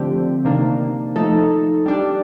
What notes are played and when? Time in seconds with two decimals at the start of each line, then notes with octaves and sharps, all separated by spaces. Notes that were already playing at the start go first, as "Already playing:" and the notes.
Already playing: D3 F3 A3 C4 G4
0.44 C3 D#3 A#3 D4
1.16 F3 A3 D#4 A4
1.86 G3 D4 G4